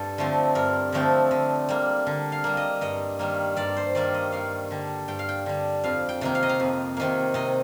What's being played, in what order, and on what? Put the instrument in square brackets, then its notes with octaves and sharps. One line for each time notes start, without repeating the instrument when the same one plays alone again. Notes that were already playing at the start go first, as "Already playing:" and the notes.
Already playing: [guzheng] G2 A4
D3 F3 A3 C4
G2 A#4
D3 F3 A3 C4
D3
G3 A#3
D3
F5
G3 A#3
D#5
G2 D#5
D#3 G3 A#3
G2 D5
C5
D#3 G3 A#3 D5
D#5
G2 F5
D3 G3
G2 G5
F5
G5
D3 G3
F2 F5
G5
C3 D#3 A#3
F5
D#5
F5
F2
C3 D#3 A#3
C3 D#5